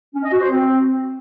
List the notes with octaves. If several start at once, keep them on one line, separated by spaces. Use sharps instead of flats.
C#4
D#5
F#4
C5
C4